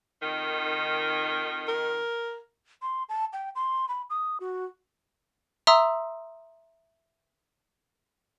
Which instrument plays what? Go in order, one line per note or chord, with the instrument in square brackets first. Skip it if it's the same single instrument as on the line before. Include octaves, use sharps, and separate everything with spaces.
[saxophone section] F2 D#3
[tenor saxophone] A#4
[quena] C6
A5
G5
C6
B5
D#6
F#4
[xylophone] E5 A#5 C6 D#6 E6